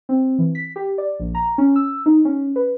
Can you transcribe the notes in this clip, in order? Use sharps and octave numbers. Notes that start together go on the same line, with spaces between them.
C4
E3
B6
G4
D5
A#1
A#5
C#4
E6
D#4
C#4
B4